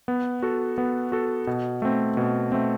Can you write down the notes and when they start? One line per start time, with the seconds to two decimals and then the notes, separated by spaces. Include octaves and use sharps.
0.08 B3
0.43 F#4 A4
0.78 B3
1.12 F#4 A4
1.47 B2
1.82 A3 C4
2.17 B2
2.52 A3 C4